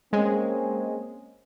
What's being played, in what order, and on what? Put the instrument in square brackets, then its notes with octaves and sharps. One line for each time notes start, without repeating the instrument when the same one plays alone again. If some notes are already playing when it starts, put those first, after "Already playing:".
[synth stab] G#3 [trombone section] A#3 C4 C#4